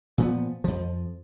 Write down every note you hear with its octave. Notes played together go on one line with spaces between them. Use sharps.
A#2 F3 B3
F2 F3